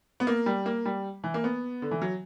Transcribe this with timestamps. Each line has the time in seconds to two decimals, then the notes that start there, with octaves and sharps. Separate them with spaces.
0.20 B3
0.27 A#3
0.46 G3
0.66 A#3
0.86 G3
1.24 E3
1.34 A#3
1.44 B3
1.82 D3
1.91 E3
2.02 F#3